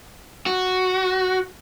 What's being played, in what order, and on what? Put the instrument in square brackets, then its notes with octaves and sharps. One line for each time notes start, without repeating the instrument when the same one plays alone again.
[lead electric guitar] F#4